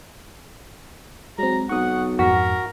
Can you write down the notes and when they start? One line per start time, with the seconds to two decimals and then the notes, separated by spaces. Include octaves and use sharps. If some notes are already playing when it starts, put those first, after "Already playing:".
1.38 F#3 G#3 C4 A#5
1.69 B1 F#5 C#6 D#6
2.19 F2 G#2 F#4 A#4 B6